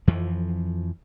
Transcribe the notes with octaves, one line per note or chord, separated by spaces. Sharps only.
F2 E3 F3